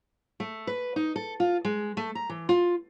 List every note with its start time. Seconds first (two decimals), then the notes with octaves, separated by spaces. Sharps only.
0.40 A3
0.67 B4
0.96 D#4
1.16 A4
1.40 F4
1.65 G#3
1.97 A3
2.15 A#5
2.29 E3
2.49 F4